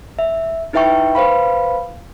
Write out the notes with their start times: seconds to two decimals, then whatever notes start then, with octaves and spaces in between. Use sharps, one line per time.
0.19 E5
0.73 D#4 E4 B4 E5 G5 C#6
1.15 B4 C5 F5 B5